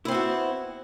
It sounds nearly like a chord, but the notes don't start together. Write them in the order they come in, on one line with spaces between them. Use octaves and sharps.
E4 C4 B3 F#4